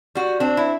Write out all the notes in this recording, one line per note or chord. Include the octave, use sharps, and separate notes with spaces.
G3 F#4
C4 D4
E4